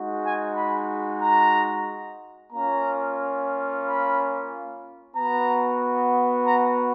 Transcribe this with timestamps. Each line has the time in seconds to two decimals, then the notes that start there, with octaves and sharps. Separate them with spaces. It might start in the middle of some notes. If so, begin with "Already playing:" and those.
Already playing: G#3 D#4 F#4
0.23 G#5
0.56 B5
1.22 A#5
2.53 A#3 C#4 F4 A#5
3.84 B5
5.15 B3 F#4 A#5
6.47 A#5